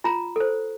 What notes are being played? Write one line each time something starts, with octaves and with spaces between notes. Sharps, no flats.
F4 A#5
A4 C5